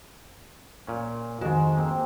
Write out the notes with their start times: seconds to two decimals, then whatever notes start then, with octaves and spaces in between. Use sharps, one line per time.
0.87 A#2 C#4
1.41 F2 G#2 D#3 G#3 F#4
1.77 A#3 C4 G4